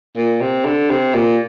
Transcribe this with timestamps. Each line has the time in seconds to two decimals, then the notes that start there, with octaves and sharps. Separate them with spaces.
0.17 A#2
0.41 C3
0.65 D3
0.90 C3
1.14 A#2